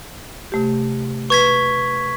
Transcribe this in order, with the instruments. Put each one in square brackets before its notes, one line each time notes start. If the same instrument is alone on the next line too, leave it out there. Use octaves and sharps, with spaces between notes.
[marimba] C3 A3 G4
[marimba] B4 [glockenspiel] C#6 G#6 B6